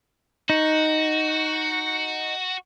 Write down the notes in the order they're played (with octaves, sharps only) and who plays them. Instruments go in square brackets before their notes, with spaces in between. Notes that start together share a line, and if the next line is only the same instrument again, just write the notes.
[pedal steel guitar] D#4 [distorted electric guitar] F#4